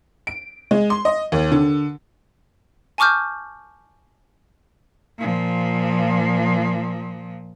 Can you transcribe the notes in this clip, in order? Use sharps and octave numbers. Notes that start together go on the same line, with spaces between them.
D7
G#3
C6
D#5
D#2
D3
G#5 A5 C#6 D6 F6 G6
A#2 F3